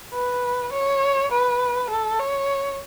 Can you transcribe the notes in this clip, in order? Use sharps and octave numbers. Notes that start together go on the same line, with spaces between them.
B4
C#5
B4
A4
C#5